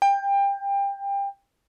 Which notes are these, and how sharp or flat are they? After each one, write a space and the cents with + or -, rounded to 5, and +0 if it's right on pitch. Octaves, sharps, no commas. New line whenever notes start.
G5 +25